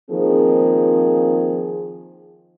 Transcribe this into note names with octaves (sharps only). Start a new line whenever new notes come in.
D#3 F3 A#3 C4 G#4